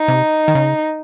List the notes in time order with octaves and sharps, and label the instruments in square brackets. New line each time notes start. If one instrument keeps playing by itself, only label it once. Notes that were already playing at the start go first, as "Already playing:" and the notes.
Already playing: [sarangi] D#4
[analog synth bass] C3
D#3
C#3